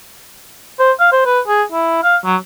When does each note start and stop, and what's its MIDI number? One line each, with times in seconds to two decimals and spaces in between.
0.79 0.92 72
1.00 1.10 77
1.12 1.24 72
1.26 1.40 71
1.48 1.63 68
1.72 2.00 64
2.03 2.17 77
2.25 2.36 54